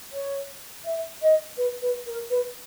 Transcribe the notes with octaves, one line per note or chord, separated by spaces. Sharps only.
C#5
E5
D#5
B4
B4
A#4
B4